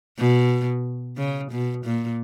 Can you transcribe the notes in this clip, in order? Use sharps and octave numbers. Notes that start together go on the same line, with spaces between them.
B2
C#3
B2
A#2